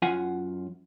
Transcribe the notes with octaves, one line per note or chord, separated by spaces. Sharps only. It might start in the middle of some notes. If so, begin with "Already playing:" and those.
F#2 F4 F#5 G#5